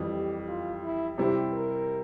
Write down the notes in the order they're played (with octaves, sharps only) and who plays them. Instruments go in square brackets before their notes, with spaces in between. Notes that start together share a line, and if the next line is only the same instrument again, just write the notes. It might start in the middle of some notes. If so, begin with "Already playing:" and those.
Already playing: [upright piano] F2 E3 G3
[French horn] G4
F4
E4
[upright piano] C3 G3 C4 E4 [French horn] G4
[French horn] A#4